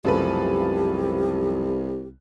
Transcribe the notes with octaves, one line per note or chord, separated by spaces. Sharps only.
C2 F#2 C#3 F3 A3 G4 A4 B4